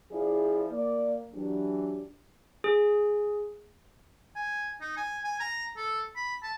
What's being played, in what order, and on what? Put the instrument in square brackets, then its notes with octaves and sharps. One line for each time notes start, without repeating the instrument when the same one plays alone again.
[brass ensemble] F3 E4 [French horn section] C#4 G#4 D5
[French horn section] A#3 [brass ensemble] D5
[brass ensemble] E3 F#3 [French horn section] D4 G4
[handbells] G#4
[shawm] G#5
D#4
G#5
G#5
A#5
A4
B5
A5